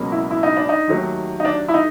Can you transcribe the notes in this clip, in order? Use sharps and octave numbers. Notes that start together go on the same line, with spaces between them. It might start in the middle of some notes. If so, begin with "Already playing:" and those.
Already playing: C#2 B2 F#3 A#3
E4
E4
D#4
D4
D#4
D#2 D#3 F#3 A3
D#4
D4
E4
D#4